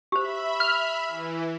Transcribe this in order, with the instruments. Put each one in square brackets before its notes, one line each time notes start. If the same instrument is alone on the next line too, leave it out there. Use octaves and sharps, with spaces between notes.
[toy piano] G4 C5 [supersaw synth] E5 B5
[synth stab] F6
[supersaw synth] E3